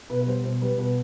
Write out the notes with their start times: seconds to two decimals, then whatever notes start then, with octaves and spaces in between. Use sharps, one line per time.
0.10 B2 B4
0.21 B4
0.27 G3 C5
0.44 B2 C5
0.62 G3 B4
0.78 B2 B4